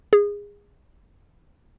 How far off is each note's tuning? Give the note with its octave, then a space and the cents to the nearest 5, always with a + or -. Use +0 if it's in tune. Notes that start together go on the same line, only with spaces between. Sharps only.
G#4 -25